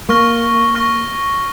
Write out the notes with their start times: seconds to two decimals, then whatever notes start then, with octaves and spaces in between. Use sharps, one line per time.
0.09 A#3 C#6 F6 A#6
0.75 C#6 F6 A#6